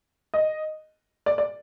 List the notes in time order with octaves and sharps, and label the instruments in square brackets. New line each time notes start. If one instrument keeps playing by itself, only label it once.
[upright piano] D#5
D5
D5